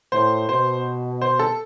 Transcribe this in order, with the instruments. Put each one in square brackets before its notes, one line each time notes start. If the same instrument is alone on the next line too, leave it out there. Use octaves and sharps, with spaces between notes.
[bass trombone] A2 [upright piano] C5
[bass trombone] B2 [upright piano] C5
[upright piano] C5
A4